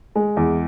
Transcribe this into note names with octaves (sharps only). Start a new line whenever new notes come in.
G#3
E2